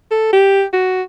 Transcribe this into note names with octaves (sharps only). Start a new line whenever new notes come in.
A4
G4
F#4